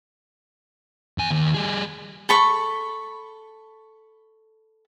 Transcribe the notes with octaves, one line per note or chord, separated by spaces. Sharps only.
E2 G#5
D#2
G3 G#4
A4 B5 C#6